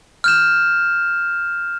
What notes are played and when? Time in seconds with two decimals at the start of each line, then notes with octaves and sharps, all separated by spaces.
0.24 F6 G6 E7